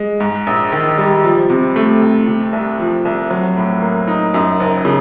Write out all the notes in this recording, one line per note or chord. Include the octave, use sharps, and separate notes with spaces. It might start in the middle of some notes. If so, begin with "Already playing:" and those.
Already playing: G#3
G#2
A#1
D#3
G3
F3
C3
A3
C3
C3
C2
F3
C2
F#3
A2
A#3
D#4
F#2
F#1
C#3